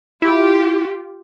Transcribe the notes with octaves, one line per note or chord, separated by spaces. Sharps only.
E4 F4 G4